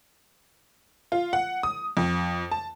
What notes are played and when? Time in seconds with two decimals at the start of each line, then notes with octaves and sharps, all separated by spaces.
1.12 F4
1.33 F#5
1.63 D#6
1.97 F2
2.52 A5